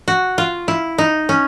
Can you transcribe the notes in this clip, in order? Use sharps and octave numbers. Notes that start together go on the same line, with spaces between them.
F#4
F4
E4
D#4
C#4